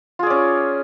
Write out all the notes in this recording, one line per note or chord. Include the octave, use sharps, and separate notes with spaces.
C#4 F4 G#4 D5